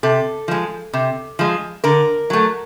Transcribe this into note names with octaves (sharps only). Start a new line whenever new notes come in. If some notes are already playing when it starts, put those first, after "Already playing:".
C3 A4
F3 G#3
C3
F3 G#3
D3 A#4
F#3 A3